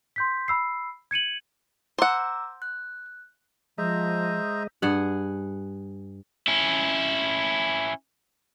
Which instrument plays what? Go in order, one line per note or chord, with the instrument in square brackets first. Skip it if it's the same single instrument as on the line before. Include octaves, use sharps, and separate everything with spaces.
[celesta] C6 G6 B6
B5 E6 C7
G#6 C#7 D#7 F#7
[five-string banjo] C5 F#5 [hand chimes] A#5 D6 E6
[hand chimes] F#6
[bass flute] F3 [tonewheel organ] G#3 D#5 [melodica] C5 E5 A#5
[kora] G2 G#4 F#5
[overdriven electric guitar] C#4 E4